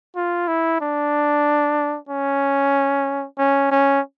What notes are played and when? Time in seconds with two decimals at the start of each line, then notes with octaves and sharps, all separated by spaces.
0.16 F4
0.48 E4
0.81 D4
2.09 C#4
3.38 C#4
3.71 C#4